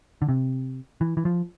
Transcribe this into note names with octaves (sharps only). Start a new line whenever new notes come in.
D3
C3
E3
E3
F3